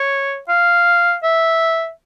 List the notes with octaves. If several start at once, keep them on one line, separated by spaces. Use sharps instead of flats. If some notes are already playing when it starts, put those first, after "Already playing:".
Already playing: C#5
F5
E5